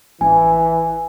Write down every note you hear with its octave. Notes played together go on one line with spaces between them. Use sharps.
A1 E3 G#5